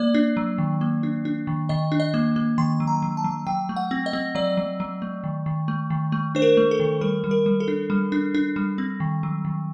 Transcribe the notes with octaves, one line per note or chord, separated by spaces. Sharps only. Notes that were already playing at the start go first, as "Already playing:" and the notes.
Already playing: A#3 D5
D4
F#3
D#3
A#3
D4
D4
D#3
D#3 D#5
D4
D#5
A#3
A#3
D#3 C6
F#3
A#5
F#3
A5
F#3
F#3 G5
A3
F#5
C4
D#5
C4
F#3 D5
F#3
F#3
A3
D#3
D#3
A3
D#3
A3
D4 C5
A#4
A3
A4
D#3
G3 A#4
G3
A#4
G3
A4
D4
G3
D4
D4
G3
C4
D#3
F#3
D#3